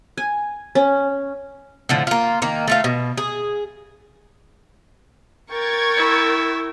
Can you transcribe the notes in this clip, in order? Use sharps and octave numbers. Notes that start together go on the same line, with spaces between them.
G#5
C#4
A2 D3 F3
A#3 F4
D#3 A#3
A3 F4 F5
B2
G#4
A#4 G5 C#6 G#6 A6
E4